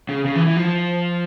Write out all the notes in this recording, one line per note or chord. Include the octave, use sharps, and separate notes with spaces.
C#3
C#3
E3
E3
F3